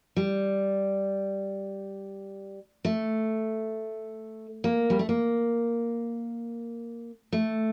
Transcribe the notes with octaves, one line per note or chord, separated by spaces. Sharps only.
G3
A3
A#3
G3
A3
A#3
A3